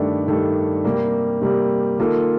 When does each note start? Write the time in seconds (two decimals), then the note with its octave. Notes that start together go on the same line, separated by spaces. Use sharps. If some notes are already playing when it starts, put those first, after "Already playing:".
Already playing: G2 D#3 A3 D4 A4
0.27 G2 D#3 A3 D4 A4
0.85 C3 G3 A#3
1.42 C3 G3 A#3
1.99 D#3 A#3 F4 A4